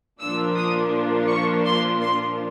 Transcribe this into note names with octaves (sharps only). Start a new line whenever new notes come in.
A#2 F3 A#3 D4 F4 E6
D#6
C#6
C6
C6